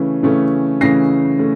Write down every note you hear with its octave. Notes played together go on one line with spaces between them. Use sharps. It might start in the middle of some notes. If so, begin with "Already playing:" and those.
Already playing: C#3 E3 A3 C#4
C#3 E3 A3 C#4
C#3 E3 A3 C#4 A#6 C7
A3 C#4